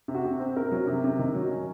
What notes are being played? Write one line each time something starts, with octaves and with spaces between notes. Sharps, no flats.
C3
F#4
C3
C4
C3 A#4
F#3
C3
C3
D#3
F#3
C#4